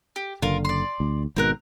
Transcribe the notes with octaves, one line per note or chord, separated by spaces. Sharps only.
G4
F#1 D3 F4 A#4
D5 C6
D2
G#1 G#2 B2 C4 A#4 F#6